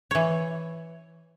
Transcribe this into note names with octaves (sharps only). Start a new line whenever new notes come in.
E3 C#5